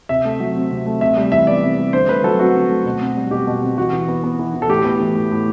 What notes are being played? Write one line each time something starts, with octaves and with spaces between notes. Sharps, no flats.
C3 E5
A3
F#3
C4
C3
A3
C3 E5
G3
E3 E5
B3 D5
C3
G3
D3 C5
A3 B4
F#3 A4
C4 F#4
D3
A3
B2
C4
G3
B2 G4
B2
C4
E3 F#4
E3
B3
B3
E3
E3
A4
A2 G4
B3
E3
A2
A2